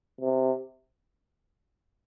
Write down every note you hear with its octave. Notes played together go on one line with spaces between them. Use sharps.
C3